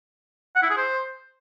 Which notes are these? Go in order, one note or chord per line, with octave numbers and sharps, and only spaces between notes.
F#5
E4
G#4
C5